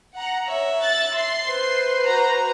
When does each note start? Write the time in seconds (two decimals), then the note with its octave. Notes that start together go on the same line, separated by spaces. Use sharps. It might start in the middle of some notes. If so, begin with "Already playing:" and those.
0.16 F#5 A#5
0.48 C#5 E5
0.82 F#6 A6
1.17 C6 C7
1.48 B4 C5
2.06 F#4 A#5